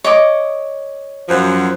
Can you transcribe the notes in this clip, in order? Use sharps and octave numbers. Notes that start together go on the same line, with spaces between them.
C#5 D#5 D6
F#2 F3